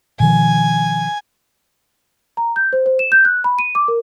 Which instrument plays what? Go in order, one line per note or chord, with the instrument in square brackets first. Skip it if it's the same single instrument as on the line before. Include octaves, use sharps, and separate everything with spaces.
[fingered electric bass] B2 D#3 F3 [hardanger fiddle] G#5
[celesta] A#5
G6
C5
C5
E7
G6
F#6
B5
D#7
D6
A#4